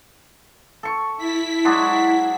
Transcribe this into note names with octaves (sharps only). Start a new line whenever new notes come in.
A4 C#6
E4 B6
F#3 G#3 D4